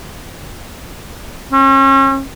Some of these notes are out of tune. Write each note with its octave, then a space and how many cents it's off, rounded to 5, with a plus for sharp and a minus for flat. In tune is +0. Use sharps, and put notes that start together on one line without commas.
C#4 -40